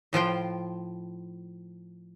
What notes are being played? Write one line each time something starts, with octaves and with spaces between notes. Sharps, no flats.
A2 F3 F4 G5